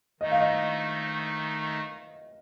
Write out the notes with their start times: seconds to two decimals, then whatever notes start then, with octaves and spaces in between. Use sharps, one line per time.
0.21 D#3 A3 D#4 D#5
0.31 F5
0.40 D#5